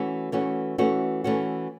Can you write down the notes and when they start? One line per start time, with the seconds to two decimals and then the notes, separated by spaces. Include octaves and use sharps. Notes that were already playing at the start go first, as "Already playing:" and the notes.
Already playing: E3 A3 C#4 F#4
0.32 E3 A3 C#4 F#4
0.78 E3 A3 C#4 F#4
1.24 E3 A3 C#4 F#4